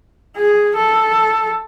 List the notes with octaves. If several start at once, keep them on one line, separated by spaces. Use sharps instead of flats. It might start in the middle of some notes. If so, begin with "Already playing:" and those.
G#4
A4